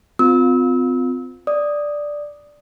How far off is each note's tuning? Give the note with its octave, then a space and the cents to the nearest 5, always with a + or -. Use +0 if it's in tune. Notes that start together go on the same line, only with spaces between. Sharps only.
C4 -35 F4 +20 E6 -30
D5 +0 D#6 +0